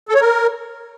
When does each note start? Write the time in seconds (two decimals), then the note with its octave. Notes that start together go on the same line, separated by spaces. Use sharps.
0.09 A4
0.15 C#5
0.21 A#4